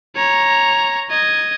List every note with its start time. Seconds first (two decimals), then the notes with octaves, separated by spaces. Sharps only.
0.16 C#5 A#5
1.10 D#5 G#6